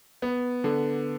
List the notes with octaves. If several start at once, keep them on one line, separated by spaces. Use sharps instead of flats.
B3
D3